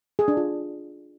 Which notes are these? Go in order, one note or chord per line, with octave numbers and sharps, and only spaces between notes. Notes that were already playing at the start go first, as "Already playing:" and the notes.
G#4
D4
F4